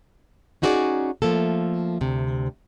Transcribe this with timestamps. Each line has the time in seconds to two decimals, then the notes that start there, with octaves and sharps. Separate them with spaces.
0.62 C#4 D#4 F#4 G#4 C5 D5
1.22 F3 A3 A#3 A4
2.01 D2 C3